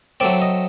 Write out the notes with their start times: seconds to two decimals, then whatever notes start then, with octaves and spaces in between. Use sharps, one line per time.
0.20 F#3 A3 C4 D5
0.42 D#5